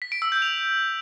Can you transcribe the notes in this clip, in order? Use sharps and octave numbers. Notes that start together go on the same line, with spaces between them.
B6
D7
E6
G6
F7